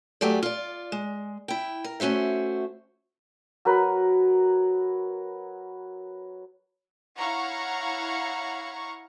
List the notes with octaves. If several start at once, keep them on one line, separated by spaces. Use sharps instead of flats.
F#3 A3 G4 G#4 D5
F4 D5
G#3
E4 G5
A#4
A3 C#4 F#4 C5 E5
F#3 A#4 B4
E4 C#5 F5 F#5 A#5 C#6